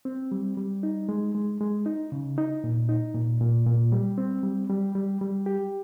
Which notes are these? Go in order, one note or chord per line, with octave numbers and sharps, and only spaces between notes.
C4
G3
G3
D#4
G#3
G#3
G#3
D#4
C#3
D#4
A#2
D#4
A#2
A#2
A#2
G3
C4
G3
G3
G3
G3
G4